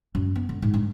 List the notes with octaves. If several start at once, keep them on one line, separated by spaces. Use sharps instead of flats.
F#2
B3
D3
G#2
G2